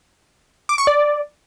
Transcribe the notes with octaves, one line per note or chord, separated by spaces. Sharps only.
D6
C#6
D5